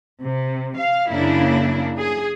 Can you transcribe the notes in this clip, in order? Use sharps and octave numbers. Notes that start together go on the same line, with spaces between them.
C3
F5
F#2 C#3 A#3 D4 E4
G#4